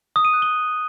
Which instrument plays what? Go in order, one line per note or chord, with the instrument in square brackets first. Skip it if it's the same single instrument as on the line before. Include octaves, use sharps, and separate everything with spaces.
[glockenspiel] D#6
D#7
F#6
G7